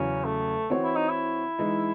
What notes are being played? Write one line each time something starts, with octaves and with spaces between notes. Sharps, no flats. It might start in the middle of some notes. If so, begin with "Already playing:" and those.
Already playing: E2 C#3 F#3 C#4
A3
E3 C4 F#4 C#5
E4
D#4
E4
E3 G#3 D#4